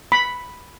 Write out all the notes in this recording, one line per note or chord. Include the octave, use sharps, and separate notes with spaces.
B5